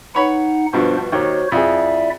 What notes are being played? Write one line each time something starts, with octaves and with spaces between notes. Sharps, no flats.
D#4 B4 C#5 F#5 B5
G2 B2 F3 B3 D4 C5
D#2 D#3 F#4 C5 C#5
F2 E4 G#4 D5 E5